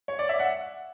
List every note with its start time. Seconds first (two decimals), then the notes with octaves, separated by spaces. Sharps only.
0.08 C#5
0.19 D5
0.29 E5
0.39 F#5